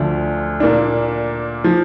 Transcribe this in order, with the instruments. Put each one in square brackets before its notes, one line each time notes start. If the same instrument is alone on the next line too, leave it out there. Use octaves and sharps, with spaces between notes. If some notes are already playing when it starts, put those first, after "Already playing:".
Already playing: [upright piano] D2 D3 F3 D4
A#2 A#3 D4
F3